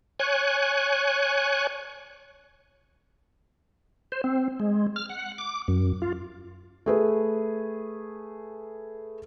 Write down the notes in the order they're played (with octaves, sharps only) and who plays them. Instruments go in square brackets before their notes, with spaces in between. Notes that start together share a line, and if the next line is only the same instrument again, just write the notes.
[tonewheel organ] C#5 G#5 F#6
C5
C4
G#3
F6
F#5
D6
F#2
F4
[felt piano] A3 G#4 B4